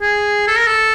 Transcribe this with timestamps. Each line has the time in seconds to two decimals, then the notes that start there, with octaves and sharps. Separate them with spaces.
0.01 G#4
0.47 A4
0.57 A#4
0.67 A4